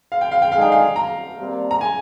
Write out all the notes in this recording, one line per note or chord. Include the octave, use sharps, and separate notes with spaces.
F5
G5
F5
G5
D3 G#3 D#4 G#4 F5
G5
F5
A#5
C3 G3 A#3 D4
A#5
G#5